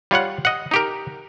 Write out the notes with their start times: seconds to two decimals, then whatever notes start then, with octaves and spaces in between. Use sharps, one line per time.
0.11 G3 F4 C#5 F#5
0.45 D#5 F#5
0.71 D#4 G4 A#4